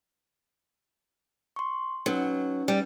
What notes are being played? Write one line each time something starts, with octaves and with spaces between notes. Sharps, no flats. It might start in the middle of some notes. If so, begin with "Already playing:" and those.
C6 C#6
F#3 C#4 D#4 B4
G3